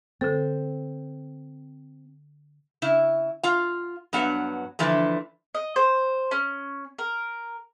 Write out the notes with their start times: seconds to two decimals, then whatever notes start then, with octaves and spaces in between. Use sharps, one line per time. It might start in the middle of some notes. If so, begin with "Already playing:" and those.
0.21 D3 C4 A4
2.82 C#3 E4
3.43 F4 F5
4.13 G2 F#3 B3 F#5
4.79 D3 E3 F3 A3
5.55 D#5
5.76 C5
6.31 C#4
6.98 A#4